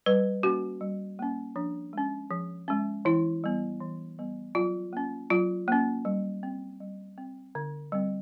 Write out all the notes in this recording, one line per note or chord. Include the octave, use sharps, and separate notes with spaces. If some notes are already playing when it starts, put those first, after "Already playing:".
G3 B4
A#3 C#4 F#4
G3
A#3 C#4
F3 D4
G#3 C#4
F3
G#3 C#4
E3 E4
G3 B3
E3
G3 B3
F#3 F4
A#3 C#4
F#3 F4
A#3 C#4
G3
C4
G3
C4
D3
G3 C4